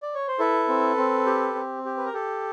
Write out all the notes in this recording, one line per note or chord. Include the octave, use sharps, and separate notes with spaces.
D5
C#5
C5
E4 A4 B4
C4
C4
G4
C4
G4
B4
A#4
G4 A4